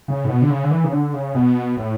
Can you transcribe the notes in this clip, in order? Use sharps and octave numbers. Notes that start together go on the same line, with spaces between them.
C#3
A2
B2
D3
C#3
D3
E3
C#3
D3
C#3
B2
A2